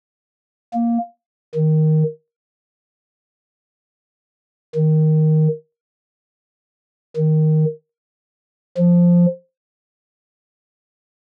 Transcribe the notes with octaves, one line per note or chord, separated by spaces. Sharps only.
A#3
D#3
D#3
D#3
F3